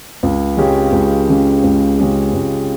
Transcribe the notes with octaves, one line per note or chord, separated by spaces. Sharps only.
C#2
C#3 G#3 C#4 G4
C#2
C#3 G#3 C#4 G4
C#2
C#3 G#3 C#4 G4
C#2